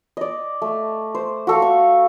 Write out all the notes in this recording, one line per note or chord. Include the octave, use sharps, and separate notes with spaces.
D5 D#5
A3
C5
F#4 A4 F5
C#6